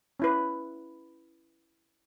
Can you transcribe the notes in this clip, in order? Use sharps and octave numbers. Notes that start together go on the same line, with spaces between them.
C#4 E4 B4